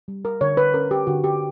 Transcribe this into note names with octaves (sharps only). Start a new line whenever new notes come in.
G3
A#4
D3 C#5
B4
C#4 A#4
G4
D3 F#4
G4